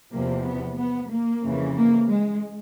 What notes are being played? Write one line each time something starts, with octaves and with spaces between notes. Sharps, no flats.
E2 C3 F3 A#3
B3
B3
A#3
F2 C#3 E3
A#3
G#3